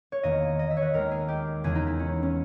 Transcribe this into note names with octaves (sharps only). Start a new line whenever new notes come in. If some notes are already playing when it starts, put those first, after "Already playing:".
C#5
E2 D#3 A#3 D#5
D#5
E5
C#5
B4
D#2 D#3 G#3 A#4
G#4
G4
E2 C#3 E3 G#3 G#4
D#4
E4
C#4
C#4